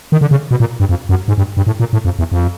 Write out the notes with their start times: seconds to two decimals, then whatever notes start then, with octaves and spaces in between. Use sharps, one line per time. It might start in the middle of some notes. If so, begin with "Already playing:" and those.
0.12 D#3
0.21 D3
0.31 C#3
0.51 B2
0.60 A#2
0.80 G2
0.89 F2
1.09 F#2
1.28 G#2
1.38 G2
1.57 G2
1.67 A2
1.80 A#2
1.93 A2
2.05 F2
2.19 E2
2.32 F2